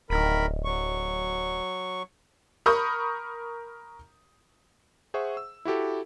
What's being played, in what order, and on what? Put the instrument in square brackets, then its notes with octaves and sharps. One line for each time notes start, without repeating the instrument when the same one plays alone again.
[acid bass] D1 [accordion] D#3 A#4 B5
[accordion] F#3 C#6
[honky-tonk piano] A#4 B5 C#6 D#6 G6
[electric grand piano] G#4 C5 E5 F#5 C#6
E6
E4 F#4 G4 A4